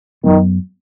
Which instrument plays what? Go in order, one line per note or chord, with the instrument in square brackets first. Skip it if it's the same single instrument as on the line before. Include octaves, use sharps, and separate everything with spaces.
[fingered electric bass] F#2 F#3 B3 [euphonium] D#3